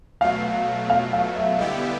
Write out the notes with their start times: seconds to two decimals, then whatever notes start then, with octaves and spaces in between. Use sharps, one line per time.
0.21 B2 F#3 A3 F5
0.90 F5
1.13 F5
1.36 E5
1.58 D3 G3 B3 E4 G4 D#5